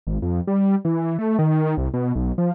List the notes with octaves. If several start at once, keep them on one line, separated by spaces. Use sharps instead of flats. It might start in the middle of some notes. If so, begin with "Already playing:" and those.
G#1
F2
G3
E3
A3
D#3
C2
B2
B1
F3